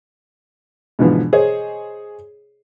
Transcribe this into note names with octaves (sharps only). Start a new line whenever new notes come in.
G#2 B2 D3 E3 F3
G#4 C5 C#5 D#5